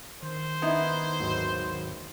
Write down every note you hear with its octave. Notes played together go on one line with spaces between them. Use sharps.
D#3 C5
B3 D#4 E4
G#1 D#2 F#3